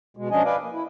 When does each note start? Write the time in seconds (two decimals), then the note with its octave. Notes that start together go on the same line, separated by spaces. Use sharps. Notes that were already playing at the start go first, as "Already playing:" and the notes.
0.17 B2 G#3
0.31 F3 C#4 D4 D#5 G#5
0.45 B4 D5 F5 G#5
0.61 A#3
0.72 E4